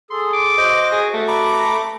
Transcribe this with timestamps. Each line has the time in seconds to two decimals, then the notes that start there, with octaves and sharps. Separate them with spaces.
0.11 G#4 A4 C6
0.33 D6
0.58 F#4 C5 D#5
0.92 G#4
1.14 A3
1.28 A#5 B5 D6